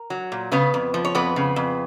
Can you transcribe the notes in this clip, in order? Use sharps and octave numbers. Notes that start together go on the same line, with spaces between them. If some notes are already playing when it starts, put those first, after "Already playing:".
Already playing: A#4
F#3
A#2
C#3 B3 B4
F2
F3
C#5
F2 B3 B4
C#3
F2